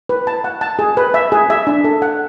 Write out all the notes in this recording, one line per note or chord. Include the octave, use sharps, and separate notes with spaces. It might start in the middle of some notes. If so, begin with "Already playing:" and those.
B4
A5
F#5
A5
G#4
B4
E5
G#4
E5
D4
A4
F#5